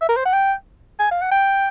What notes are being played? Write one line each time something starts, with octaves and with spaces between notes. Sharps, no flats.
E5
A#4
C5
F#5
G5
G#5
F5
F#5
G5